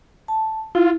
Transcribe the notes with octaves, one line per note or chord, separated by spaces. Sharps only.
A5
E4 F4